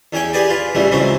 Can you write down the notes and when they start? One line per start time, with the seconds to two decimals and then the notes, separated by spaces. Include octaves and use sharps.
0.13 E2 C#4 G#4 G5
0.33 G4 G#4 B4 D5
0.49 F4 B4
0.75 A1 C#3 E3 G3 A3
0.92 C#2 C#3 E3 F#3 C4